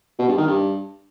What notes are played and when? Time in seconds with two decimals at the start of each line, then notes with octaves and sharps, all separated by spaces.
0.19 B2
0.28 G2
0.38 D#3
0.47 G2